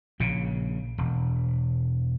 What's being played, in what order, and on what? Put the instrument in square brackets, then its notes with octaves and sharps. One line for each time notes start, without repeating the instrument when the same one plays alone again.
[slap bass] A#1 A#2 C#3
E1